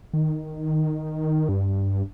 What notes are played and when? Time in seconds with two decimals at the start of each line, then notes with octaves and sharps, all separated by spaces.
0.14 D#3
1.49 G2